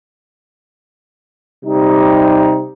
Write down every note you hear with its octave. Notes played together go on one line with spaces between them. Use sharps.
C3 G3 D#4